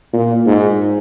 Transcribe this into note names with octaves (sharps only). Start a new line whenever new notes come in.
A#2
G#2